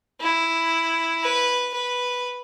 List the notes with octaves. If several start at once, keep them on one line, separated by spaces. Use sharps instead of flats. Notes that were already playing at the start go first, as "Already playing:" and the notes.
E4
B4
B4